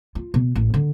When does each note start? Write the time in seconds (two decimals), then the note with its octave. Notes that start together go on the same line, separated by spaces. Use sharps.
0.15 F4
0.34 B2
0.55 A1
0.74 D3